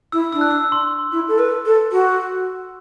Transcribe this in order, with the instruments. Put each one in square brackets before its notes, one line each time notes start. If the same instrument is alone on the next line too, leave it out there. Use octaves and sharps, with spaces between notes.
[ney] E4 [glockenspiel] E6
[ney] D4 [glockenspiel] E6
[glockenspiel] F#6
E6
C6
[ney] E4
A4
B4
A4
F#4